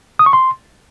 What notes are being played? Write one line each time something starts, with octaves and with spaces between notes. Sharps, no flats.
D#6
C#6
C6